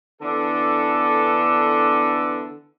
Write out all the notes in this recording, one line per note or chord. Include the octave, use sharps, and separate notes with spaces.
D3 E3 B3 D4 A4